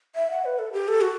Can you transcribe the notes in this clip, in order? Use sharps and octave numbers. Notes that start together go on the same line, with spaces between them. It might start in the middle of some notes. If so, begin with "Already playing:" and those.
E5
F#5
B4
A4
G4
A4
F#4